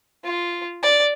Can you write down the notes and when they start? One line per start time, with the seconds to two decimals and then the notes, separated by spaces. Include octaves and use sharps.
0.24 F4
0.83 D5